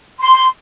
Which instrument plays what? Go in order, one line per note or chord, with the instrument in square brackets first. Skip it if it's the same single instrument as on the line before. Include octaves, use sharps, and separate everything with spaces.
[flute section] C6